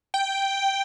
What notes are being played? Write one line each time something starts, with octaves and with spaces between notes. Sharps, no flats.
G5